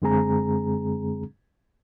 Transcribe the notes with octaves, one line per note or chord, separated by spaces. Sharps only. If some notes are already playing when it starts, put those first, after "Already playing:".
F#2 D3 G#3 C4 G#4 A#5